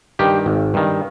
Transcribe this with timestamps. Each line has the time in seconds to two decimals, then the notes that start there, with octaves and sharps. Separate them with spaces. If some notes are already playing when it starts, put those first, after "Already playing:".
0.19 G2 D#3 G4
0.46 G#1
0.74 G2 D#3